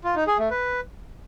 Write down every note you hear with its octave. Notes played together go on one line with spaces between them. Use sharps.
F4
D#4
G#4
A3
B4